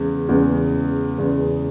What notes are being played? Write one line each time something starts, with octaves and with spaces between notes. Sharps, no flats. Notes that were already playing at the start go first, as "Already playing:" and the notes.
Already playing: E2 C#3 G#3
E2 C#3 G#3
E2 C#3 G#3